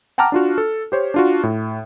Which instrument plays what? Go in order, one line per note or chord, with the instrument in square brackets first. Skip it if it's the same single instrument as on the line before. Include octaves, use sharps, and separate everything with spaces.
[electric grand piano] F#5 G5 A5 A#5 D6 F6
D4 F4 F#4
A4
G4 C5 C#5
D4 F4 F#4
A2